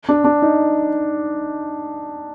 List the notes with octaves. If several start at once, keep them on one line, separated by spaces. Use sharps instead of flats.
D4
D4
D#4